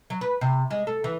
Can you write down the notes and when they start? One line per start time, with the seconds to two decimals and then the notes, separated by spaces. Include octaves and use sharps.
0.10 F#3
0.21 B4
0.41 C3
0.70 G#3
0.87 A4
1.04 E3